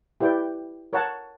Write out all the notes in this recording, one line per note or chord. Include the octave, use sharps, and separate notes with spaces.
E4 G4 B4 D5 G5
A#4 C#5 F#5 A5